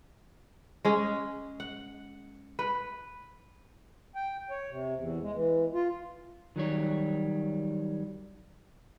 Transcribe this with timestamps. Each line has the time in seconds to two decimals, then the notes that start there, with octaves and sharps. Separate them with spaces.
0.85 G#3 C#4 G#4
1.60 F#5
2.59 B4
4.15 G5
4.50 C#5
4.70 C3
4.97 E2
5.22 G#3
5.35 E3
5.74 F4
6.56 D#3 F#3 G3 C#5